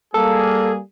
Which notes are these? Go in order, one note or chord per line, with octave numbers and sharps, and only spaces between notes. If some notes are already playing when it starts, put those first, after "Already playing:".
G3 A#3 G#4 A4